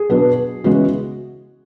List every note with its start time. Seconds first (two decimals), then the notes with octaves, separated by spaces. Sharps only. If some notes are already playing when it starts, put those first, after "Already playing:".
Already playing: G#4
0.10 B2 F#3 B3 D4
0.64 C#3 E3 G#3 B3 F#4